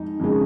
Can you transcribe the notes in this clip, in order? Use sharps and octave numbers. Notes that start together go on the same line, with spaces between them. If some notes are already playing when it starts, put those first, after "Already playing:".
Already playing: F2 G#3 D#4
F2 C#3 G#3